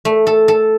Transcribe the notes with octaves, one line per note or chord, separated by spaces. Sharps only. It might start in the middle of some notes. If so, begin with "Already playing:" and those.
A3
A4
A4